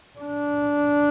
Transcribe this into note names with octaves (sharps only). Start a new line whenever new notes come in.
D4